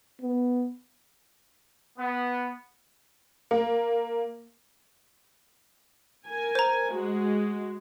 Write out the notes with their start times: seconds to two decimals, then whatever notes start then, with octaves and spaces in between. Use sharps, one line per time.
0.21 B3
1.98 B3
3.51 A#3
6.26 A#4 G#5
6.55 C5 A#5
6.92 G#3 F#4